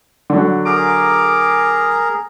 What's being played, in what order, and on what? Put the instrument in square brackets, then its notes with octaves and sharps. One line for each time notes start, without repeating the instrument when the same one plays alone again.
[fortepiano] D3 F#3
[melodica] G#4 A#4 A#5 [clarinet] D6